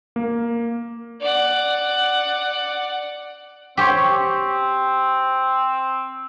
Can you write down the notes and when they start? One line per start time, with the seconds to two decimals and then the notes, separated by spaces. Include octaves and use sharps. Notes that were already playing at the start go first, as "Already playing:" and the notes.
0.16 A#3
1.21 D5 F#5
3.77 C4 G4 C5 C#5